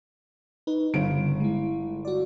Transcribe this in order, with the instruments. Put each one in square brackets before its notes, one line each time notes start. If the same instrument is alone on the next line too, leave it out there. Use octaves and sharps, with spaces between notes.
[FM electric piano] D#4 B4
[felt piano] G1 D7 [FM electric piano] C#3
[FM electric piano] G#3 E4
F#4 D5